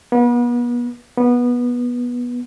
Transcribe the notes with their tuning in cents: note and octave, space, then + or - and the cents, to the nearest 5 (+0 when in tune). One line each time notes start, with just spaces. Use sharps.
B3 -35
B3 -15